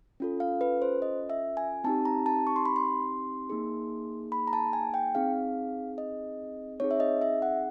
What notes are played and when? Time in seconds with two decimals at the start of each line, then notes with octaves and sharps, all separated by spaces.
0.20 C#4 F4 A4
0.40 F5
0.61 B4
0.82 C5
1.02 D#5
1.30 E5
1.57 G#5
1.84 C4 D#4 G4 A5
2.05 A#5
2.26 A5
2.47 C#6
2.56 C6
2.65 B5
2.76 C6
3.50 A#3 D#4 G#4
4.32 B5
4.47 A#5
4.53 A5
4.73 G#5
4.94 G5
5.15 C4 D#4 G#4 F5
5.98 D#5
6.80 C4 D#4 G#4 C#5
6.91 E5
7.00 D#5
7.22 E5
7.42 F#5